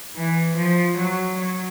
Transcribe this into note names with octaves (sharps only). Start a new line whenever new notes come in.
E3
F3
F#3
F#3